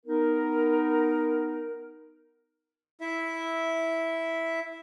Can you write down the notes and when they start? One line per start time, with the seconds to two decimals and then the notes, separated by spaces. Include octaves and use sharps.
0.05 B3 D#4 A#4
3.01 E4 E5